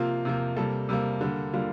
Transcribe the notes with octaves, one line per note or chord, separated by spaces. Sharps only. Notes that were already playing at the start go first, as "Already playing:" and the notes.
Already playing: C3 F3 A#3 F4
C3 F3 A#3
C3 G3 A#3 A4
C3 G3 A#3
D3 G3 A#3
D3 G3 A#3 F4